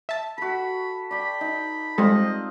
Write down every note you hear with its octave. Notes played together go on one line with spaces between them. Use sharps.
E5 A5
F#4 A4 B5
D5 G5 B5
D#4
G3 G#3 C4 F4 A4 D#5